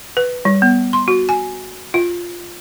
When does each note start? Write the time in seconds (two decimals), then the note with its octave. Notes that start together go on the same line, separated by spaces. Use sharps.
0.17 B4
0.45 G3
0.62 B3
0.93 C6
1.08 F#4
1.29 G#5
1.94 F4